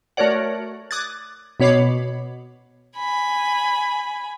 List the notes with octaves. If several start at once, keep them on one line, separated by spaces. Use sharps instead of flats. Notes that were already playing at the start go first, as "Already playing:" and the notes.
A3 F#4 A#4 C#5 D5 F#5
D6 D#6 F#6 G#6 A6
B2 B3 C#5 B5 D6 C7
G#5 B5